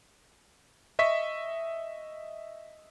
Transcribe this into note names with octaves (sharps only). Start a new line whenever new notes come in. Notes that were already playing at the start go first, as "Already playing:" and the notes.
D#5 E5 C#6 B6